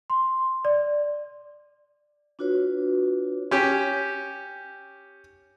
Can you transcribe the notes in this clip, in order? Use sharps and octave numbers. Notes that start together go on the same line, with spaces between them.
C6
D5
D4 F4 F#4 B4 C#5
C#4 G4